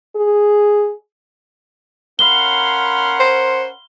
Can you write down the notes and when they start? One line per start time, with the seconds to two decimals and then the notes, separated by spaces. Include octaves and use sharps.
0.16 G#4
2.19 C#4 A#4 F5 F#5 B5 C6 G7
3.20 C5